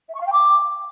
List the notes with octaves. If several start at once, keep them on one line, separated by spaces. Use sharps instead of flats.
E5
C#6
F5
G5
D6